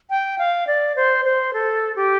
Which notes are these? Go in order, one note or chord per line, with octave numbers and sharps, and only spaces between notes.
G5
F5
D5
C5
C5
A4
G4